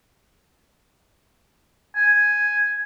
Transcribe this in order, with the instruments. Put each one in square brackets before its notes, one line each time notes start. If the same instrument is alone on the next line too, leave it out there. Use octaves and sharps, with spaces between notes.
[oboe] G#5